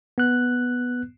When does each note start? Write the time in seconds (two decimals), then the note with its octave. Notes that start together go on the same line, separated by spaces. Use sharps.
0.18 B3 F#6